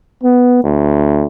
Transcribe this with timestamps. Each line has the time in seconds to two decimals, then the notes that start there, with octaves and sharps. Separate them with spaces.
0.23 B3
0.64 D2